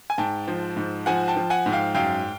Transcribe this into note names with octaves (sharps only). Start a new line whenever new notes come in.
G#5
G#2 G5 A5
F3
G#2
F3 F#5 G#5
G5 A5
F3
F#5 G#5
G#2
F5 G5
F#2 F5 G5